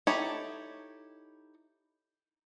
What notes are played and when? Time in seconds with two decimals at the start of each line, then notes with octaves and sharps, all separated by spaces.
0.07 D#4 E4 G4 A4 C#5